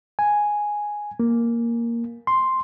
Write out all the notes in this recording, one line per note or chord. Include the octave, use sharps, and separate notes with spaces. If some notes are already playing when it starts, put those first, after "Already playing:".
G#5
A#3
C6